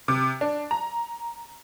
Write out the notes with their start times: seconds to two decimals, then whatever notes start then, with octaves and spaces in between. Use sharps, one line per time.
0.08 C3
0.41 D4
0.71 A#5